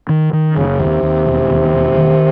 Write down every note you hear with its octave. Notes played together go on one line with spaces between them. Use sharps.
D#3
D#3
C#3
F#1
D#2 C3
D#2
E1
D#2
E1
D#3